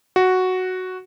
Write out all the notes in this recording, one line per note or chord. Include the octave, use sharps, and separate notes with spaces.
F#4